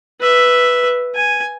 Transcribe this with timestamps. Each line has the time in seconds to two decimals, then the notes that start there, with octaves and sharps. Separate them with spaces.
0.20 B4 E5
1.15 G#5